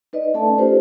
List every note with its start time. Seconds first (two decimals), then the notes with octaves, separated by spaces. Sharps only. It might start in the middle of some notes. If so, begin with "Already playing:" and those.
0.13 D#4 B4 D5 D#5
0.34 A3 C#4 A4 D5 E5 A5
0.58 D#4 F4 G4 A4 B4 C5